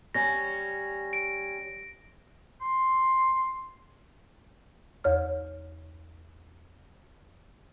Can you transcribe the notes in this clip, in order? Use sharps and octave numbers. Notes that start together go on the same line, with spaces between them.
G3 C#4 A#6
D7
C6
E2 C#5 F6